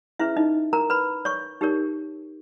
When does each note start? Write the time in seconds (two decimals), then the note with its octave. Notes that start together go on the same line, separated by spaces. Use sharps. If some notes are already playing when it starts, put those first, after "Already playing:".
0.19 C#4 E4 G#4 B4 E5
0.37 D#4 D#5
0.73 A#4 A#5
0.90 B4 B5
1.25 C#5 C#6
1.61 D#4 G4 A#4 C#5